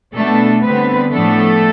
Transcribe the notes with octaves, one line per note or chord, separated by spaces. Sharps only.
B2 A3 B3 D4 A4
D3 G3 B3 C4 B4
A2 F3 A3 B3 D4 A4